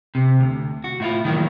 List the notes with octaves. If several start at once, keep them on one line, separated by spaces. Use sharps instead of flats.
C3
D2
F#4
A2 E4 F4
D#3 E3 F#3 A#3